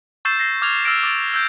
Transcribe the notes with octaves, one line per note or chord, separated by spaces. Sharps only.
C#6 E6 G6 A6 C7 E7
A#6 C7
D6 F6 G#6 F7
E6 F6 A6 A#6 D7
D6 A6 D7
E6 G6